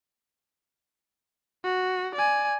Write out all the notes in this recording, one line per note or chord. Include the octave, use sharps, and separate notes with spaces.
F#4
D5 G#5